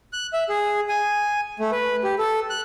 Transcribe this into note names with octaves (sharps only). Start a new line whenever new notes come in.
F#6
E5
G#4
G#5
A3
B4
G4
A4
F#6